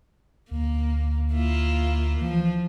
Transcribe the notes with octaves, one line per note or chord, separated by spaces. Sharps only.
D2 A#3
A#3 E4 F4
E3 F3